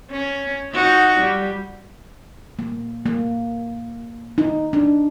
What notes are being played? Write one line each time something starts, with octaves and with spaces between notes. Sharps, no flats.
C#4
D#4 F#4
G3
A#3
A#3
D#4
D4